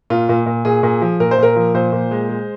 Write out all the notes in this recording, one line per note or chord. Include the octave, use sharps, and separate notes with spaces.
A#2 F4
A#2
A#2
A#2 G#4
A#2
F3
A#2 A#4
C5
A#2 A#4
F3
A#2 C5
A#2
G#3
G#3